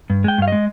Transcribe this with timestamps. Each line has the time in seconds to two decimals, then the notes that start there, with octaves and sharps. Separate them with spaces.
0.10 G2
0.24 G#3 G5
0.38 G2 F5
0.48 G#3 D#5